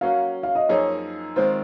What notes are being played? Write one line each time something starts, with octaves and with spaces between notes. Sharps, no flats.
F#3 A#3 C#4 F#4 F5
F5
D#5
F#2 F3 A#3 D#4 G#4 C#5
D#3 G#3 C4 F4 C5